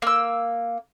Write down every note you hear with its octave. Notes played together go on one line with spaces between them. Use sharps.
A#3 E6